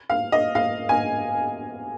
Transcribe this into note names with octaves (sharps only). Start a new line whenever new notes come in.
F5
D#5
F5
G#5